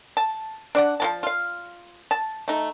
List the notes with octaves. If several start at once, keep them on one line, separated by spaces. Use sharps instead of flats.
A5
D4 D5 F#5
F3 F#3 A5
F4 F5
A5
A3 D#4